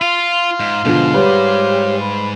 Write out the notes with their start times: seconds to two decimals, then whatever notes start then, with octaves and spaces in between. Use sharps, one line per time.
0.02 F4 F5 C6
0.60 G#2
0.85 G#2 B2 D3 F3
1.14 G3 G4 B4 C#5
2.01 B5